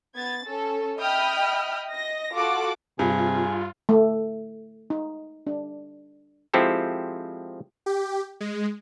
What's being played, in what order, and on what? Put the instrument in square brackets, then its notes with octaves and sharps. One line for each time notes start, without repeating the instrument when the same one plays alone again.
[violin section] B3 G#6 A6
C#4 A4
D#5 E5 G5 B5 D#6 F6
D#5 A#6
F4 F#4 A4 F#5 D6
[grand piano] G2 [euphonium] C3 [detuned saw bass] F4 [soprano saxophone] G#4
[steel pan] A3
D#4
D4
[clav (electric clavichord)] F3 G#3 C4 E4 G4 A4
[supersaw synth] G4
G#3